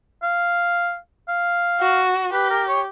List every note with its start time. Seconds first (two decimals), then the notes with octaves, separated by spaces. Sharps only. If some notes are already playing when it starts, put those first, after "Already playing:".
0.23 F5
1.29 F5
1.80 F#4
2.33 G4 B4
2.50 A#4
2.68 C#5